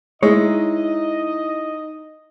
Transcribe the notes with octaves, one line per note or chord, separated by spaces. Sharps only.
G#3 D#4 E4 C#5 D#5